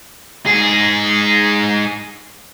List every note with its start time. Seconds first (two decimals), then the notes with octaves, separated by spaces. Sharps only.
0.46 G#2 G#4